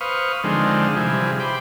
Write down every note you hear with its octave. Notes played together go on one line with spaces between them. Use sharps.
B4 C5 F5 C#6 D#6
D3 D#3 F3 G#3 C4
C3 E3 F3 G3 G#4
C5 G5 B5 D6